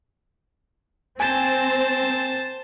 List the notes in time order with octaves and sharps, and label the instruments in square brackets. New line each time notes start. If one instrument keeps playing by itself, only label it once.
[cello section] C4 [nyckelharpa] C5 A5 [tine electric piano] G#5